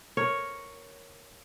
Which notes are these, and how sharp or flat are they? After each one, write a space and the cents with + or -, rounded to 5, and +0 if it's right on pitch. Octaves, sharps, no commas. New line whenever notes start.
A#4 +0 C#5 +0